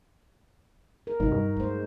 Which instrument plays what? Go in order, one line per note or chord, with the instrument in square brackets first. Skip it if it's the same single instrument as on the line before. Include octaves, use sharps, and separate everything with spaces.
[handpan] A#4
[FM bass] G#1 [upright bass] F2 C3 [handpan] D#4 F#4
[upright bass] E2 [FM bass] G2
[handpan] G#3 C5 [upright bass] A3